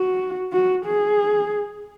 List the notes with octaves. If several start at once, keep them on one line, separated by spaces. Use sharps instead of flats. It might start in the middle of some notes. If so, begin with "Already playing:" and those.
Already playing: F#4
F#4
G#4